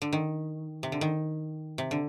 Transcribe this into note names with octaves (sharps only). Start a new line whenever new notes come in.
D3
D#3
C3
D3
D#3
C3
D3